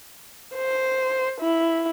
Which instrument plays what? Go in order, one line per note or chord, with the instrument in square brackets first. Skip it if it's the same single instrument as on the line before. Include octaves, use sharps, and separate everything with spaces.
[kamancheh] C5
E4